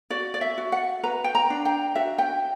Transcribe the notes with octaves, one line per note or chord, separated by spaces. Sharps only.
F#4 D5
D5
E5
F#4
F#5
B4 A#5
G5
A#5
D4
G5
F#4 E5
G5